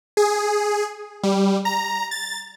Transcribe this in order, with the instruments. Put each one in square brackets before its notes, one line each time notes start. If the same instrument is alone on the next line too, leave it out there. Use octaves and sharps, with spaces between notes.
[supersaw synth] G#4
G3
A#5
A6